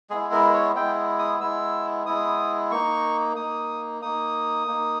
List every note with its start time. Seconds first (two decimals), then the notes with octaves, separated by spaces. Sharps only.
0.10 G#3 B3 E4 G#4
0.32 A#4
0.54 C#5
0.76 G#3 B3 E4 G5
1.19 D#6
1.41 G#3 B3 E4 E6
2.06 G#3 B3 E4 D#6
2.71 A#3 D#4 C#6
3.36 A#3 D#4 D#6
4.02 A#3 D#4 D#6
4.67 A#3 D#4